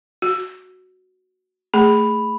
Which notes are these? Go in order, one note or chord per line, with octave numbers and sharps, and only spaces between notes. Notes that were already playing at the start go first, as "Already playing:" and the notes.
F#4
A3 G#4 B5